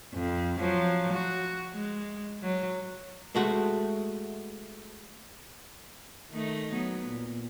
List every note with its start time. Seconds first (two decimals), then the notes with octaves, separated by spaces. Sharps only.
0.13 F2
0.59 F3 F#3
1.13 F#4
1.74 G#3
2.43 F#3
3.35 G#3 A3 F#4
6.31 D#3 A3 D#4
6.72 F#3 B3
7.07 A#2